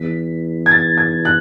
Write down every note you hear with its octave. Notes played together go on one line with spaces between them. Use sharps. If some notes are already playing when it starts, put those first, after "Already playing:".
Already playing: E2 B6
G#6
A6
G#6
F#6